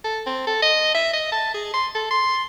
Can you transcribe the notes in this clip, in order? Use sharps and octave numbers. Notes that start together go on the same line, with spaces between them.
A4
C4
A4
D#5
E5
D#5
A5
G#4
C6
A4
C6